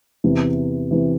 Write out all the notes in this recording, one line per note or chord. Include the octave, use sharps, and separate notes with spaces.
E2 C3 E3
C3 E3